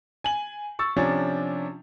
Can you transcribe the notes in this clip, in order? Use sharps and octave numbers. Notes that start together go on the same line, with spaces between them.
G#5 F#7
C#6 E6 A6
C3 F3 C#4 D4